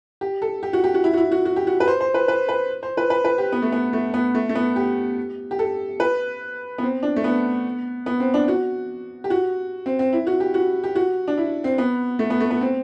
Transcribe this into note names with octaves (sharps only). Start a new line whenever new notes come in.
G4
A4
G4
F#4
G4
F#4
E4
F#4
E4
F#4
F#4
G4
F#4
B4
C5
C5
B4
B4
B4
C5
B4
B4
B4
G4
B3
A3
B3
A3
B3
A3
A3
B3
G4
G4
A4
B4
B3
C4
D4
A3
B3
B3
C4
D4
F#4
G4
F#4
C4
C4
E4
F#4
G4
F#4
G4
F#4
D4
E4
C4
B3
A3
B3
A3
B3
C4